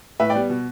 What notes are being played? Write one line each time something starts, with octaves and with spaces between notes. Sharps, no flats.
A2 B4 E5
D5 G5
G3 B3
B2